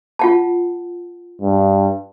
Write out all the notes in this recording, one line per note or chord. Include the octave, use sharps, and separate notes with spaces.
F4 F#5 A5
G2